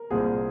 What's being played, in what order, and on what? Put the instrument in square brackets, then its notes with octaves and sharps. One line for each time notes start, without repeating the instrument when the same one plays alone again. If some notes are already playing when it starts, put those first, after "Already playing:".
Already playing: [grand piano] A#4
[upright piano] C2 A#2 G3 C4 [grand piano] G#4